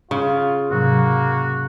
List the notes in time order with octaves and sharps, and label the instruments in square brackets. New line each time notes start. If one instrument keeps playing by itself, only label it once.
[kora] C#3 [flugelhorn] F4
[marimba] G#2 C3 F#3 [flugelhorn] A#3 [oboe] F#4